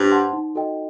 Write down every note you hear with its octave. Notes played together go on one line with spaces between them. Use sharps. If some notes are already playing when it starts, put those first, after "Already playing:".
Already playing: G2 C5
F#5 A5 C6
D#4
F#4 A4 D#5 G5